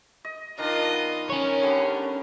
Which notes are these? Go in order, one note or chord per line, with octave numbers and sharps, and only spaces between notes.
D#5
D#3 D4 F4 A#4 D#5
B3
C#4 A#4 C#5
D3 G3 B3